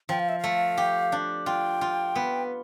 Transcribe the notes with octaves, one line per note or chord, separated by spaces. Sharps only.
F3 G5
F5
E5
A3 F5
G4
D4
F4 G5
F4
B3